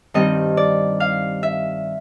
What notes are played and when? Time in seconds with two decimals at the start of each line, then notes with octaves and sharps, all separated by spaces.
0.14 G2 D#3 G3 C4 D#4 D#5
0.57 D5
1.00 F5
1.43 E5